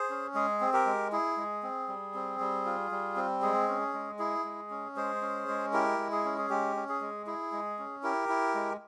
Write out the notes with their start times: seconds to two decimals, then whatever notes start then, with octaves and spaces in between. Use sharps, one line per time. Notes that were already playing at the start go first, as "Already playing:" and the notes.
Already playing: G#4 C5
0.10 C#4
0.34 G#3 G#4
0.61 C4
0.73 G4 A#4
0.86 G#3
1.12 E4 G#4
1.37 G#3
1.63 C4
1.88 G3
2.15 C4
2.40 G3
2.66 F4
2.91 G3
3.16 C4
3.42 G#3 G#4
3.68 C#4
3.93 G#3
4.19 E4 G#4
4.45 G#3
4.70 C#4
4.96 G#3 G#4 C5
5.21 C#4
5.48 G#3
5.73 E4 G4 A#4
5.98 G#3
6.12 G#4
6.25 C#4
6.38 G#4
6.50 G#3 G4
6.76 C#4
6.89 G#4
7.01 G#3
7.27 E4 G#4
7.52 G#3
7.79 C#4
8.03 E4 G4 A#4
8.29 E4
8.55 G#3